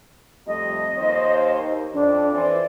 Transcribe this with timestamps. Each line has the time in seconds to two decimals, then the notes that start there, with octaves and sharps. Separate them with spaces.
0.47 F2 G3 A3 D#5
0.98 D#2 C5
1.61 D#2
1.94 F2 D4
2.33 E3 C5 D5